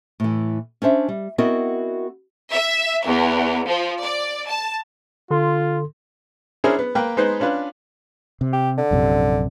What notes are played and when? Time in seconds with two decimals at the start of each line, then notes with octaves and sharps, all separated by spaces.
0.20 A2 E3
0.82 C#4 D4 C5 E5
1.08 G3
1.38 B3 C4 E4 F#4 A#4 D#5
2.50 E5
3.04 E2
3.67 F3
4.02 D5
4.48 A5
5.30 D3 F4 A4 C6
6.64 C#4 D4 E4 G#4 A#4 C5
6.79 B3
6.95 A#3 B4 G5
7.17 G#3 B3 D#4 B4 C5
7.40 C#4 D4 F4 B4
8.41 C3
8.53 G4
8.77 D3
8.91 A#1 F#2 C3